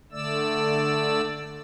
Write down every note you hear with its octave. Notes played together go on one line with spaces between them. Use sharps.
D3 A3 D5 E6